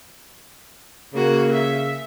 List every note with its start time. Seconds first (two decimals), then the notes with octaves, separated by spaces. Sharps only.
1.14 C#3 A#3 F#4
1.52 E5